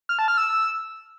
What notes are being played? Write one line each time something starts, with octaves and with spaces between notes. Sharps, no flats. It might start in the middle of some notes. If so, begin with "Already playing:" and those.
F6
A5
F6
E6